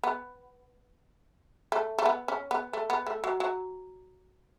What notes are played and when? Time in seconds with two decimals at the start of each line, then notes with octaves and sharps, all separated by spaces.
0.04 B3
1.72 A3
1.99 A3
2.06 B3
2.28 C#4
2.51 B3
2.73 A3
2.90 B3
3.07 A3
3.24 F#3
3.40 F#3